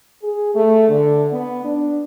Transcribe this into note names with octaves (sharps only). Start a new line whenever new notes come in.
G#4
A3
D3
B3
D4